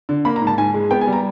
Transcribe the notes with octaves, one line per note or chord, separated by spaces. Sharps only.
D3
A#3 B5
A#5
G#2
A5
G#2 G#5
G#3
B3 G5
G#5
G3
A#5